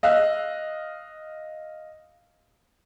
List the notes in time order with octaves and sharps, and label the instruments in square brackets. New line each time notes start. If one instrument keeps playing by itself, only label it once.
[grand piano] D#5 F5 E6 F#6